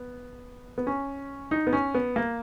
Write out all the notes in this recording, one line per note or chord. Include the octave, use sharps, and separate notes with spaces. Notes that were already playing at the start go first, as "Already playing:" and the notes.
Already playing: B3
B3
C#4
D#4
B3
C#4
B3
A#3